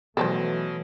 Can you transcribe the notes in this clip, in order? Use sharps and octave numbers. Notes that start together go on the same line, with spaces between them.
B2 E3 F#3 A3 A4 A#4 C5